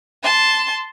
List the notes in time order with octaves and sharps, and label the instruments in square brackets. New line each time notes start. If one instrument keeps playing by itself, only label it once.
[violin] A5 C6